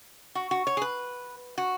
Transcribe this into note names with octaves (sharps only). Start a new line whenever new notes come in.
F#4
F#4
C#5
G#4
B4
F#4